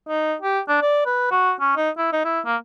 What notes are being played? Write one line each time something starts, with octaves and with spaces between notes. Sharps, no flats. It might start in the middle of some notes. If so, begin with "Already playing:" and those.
D#4
G4
D4
D5
B4
F#4
C#4
D#4
E4
D#4
E4
A#3